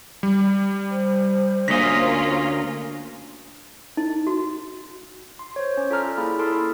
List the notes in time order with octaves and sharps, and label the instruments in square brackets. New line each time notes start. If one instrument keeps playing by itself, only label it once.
[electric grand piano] G3
[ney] C5
[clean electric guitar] D2 D#5 [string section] A#3 C#4 F4 [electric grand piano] A#6 B6
[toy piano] D#4
F#4
[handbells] C6
C5 C#5
C#4
F4 A4 D5 A5 A#5 F6
A#3 E4 G#4 B5
E4 A4 A5 C6 D#6 F6